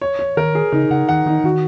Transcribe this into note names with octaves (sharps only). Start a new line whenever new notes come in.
C#5
C#5
D#3 A#4
G#4
C#3 D#4
C#3 F#5
D#3 F#5
D#3 D#4
D#3 F#4